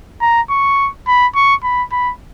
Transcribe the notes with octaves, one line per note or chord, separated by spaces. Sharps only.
A#5
C#6
B5
C#6
B5
B5